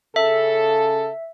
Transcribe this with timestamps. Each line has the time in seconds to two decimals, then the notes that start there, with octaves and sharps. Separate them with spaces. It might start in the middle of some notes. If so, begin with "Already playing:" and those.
0.16 C#3 A4 E5